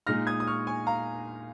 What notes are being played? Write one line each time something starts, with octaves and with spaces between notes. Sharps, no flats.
A#2 G#3 D#4 F6 A#6
D#6 G#6
D#6
C#6 F6
G#5 C#6
F5 A#5